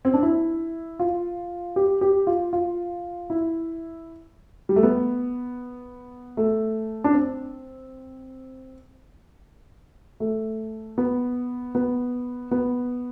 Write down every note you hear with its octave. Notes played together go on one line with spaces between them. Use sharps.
C4
D4
E4
F4
G4
G4
F4
F4
E4
G3
A3
B3
A3
D4
C4
A3
B3
B3
B3